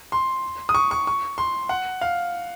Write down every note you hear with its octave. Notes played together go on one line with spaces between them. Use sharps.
C6
D#6
C#6
C#6
C#6
C6
F#5
F5